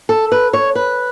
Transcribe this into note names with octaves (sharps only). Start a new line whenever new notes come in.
A4
B4
C#5
B4